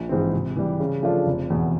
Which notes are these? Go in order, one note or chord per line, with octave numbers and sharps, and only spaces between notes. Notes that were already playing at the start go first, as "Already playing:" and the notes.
Already playing: A#1
G#2 E3 G#3 C4
C3
E3 G3
C#3
F3 A3 D4 F4
F1
E2 B2